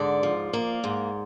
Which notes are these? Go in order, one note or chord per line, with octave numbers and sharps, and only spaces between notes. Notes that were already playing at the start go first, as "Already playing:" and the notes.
Already playing: G#2 D3 D5
F3
A#3
G#2